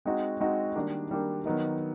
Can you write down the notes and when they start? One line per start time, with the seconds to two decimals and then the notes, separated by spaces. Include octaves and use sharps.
0.05 G#3 C4 D#4 F#4
0.40 G#3 C4 D#4 F#4
0.76 D#3 G3 A#3 D4
1.11 D#3 G3 A#3 D4
1.45 D#3 F#3 B3 D#4